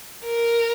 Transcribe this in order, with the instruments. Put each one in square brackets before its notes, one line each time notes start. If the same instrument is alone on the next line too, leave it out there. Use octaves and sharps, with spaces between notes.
[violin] A#4